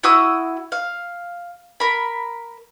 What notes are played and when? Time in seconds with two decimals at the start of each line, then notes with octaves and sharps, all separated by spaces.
0.04 E4 F#4 D#6 E6
0.72 F5
1.80 A#4 B5